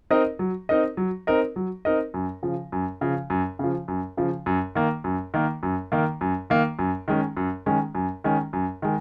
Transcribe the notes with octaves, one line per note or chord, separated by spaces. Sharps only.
C4 D#4 A#4 D#5
F#3
C4 D#4 A#4 D#5
F#3
C4 D#4 A#4 D#5
F#3
C4 D#4 A#4 D#5
F#2
C#3 F3
F#2
C#3 F3
F#2
C#3 F3
F#2
C#3 F3
F#2
D#3 A#3
F#2
D#3 A#3
F#2
D#3 A#3
F#2
D#3 A#3
F#2
D#3 G#3 C#4
F#2
D#3 G#3 C#4
F#2
D#3 G#3 C#4
F#2
D#3 G#3